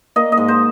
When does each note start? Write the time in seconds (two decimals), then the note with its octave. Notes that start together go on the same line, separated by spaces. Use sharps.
0.16 A#3 D#5
0.32 D#5
0.37 G#2
0.48 C5